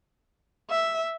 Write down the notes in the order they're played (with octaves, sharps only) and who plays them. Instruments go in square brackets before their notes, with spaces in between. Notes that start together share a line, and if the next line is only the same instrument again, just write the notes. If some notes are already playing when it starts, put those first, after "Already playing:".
[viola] E5